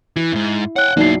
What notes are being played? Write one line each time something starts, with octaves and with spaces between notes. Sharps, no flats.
E3 E4
F2 G#2
C#5 F#5 G5 F#6
B1 F#3 A#3 D#4 E4 D5 C7